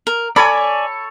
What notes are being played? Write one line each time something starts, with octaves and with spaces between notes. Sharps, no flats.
A#4
A4 C#5 D5 G#5 B5